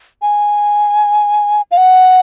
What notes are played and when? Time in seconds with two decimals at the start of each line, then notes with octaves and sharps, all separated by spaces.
0.22 G#5
1.71 F5
1.77 F#5